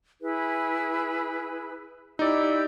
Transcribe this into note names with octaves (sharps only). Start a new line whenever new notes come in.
E4 G#4 B4
D#4 E4 G4 D5 E6